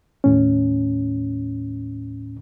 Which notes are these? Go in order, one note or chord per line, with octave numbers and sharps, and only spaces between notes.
D#2 A2 C#4